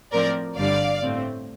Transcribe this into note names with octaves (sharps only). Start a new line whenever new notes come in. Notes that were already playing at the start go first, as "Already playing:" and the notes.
A2 F3 C4 A#4 D5
G1 G2 D3 G3 D5 F5
A2 A3 C4